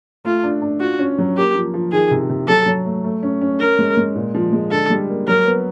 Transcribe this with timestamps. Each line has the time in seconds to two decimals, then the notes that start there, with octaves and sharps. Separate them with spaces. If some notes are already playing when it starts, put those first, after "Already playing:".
0.25 A3 F4
0.43 D4
0.62 D4
0.81 F4 F#4
0.99 C#4
1.18 F#3
1.36 A#3 G4
1.55 F3
1.74 F3
1.92 D#3 G#4
2.11 C3
2.30 C3
2.48 F#3 A4
2.66 F#3
2.86 A3
3.04 A3
3.23 C#4
3.41 C#4
3.60 C#4 A#4
3.79 G#3
3.97 G#3
4.16 A#2
4.35 F3
4.53 G#3
4.71 D3 A4
4.90 G3
5.08 A#3
5.28 F#3 A#4
5.46 B3